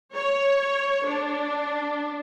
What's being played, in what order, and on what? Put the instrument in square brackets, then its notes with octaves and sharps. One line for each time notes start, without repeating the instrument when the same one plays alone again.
[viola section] C#5
D4